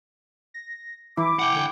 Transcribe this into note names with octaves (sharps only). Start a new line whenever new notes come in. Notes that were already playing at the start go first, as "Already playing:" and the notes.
A#6
E3 E4 D6
F#5 G5 D7
D3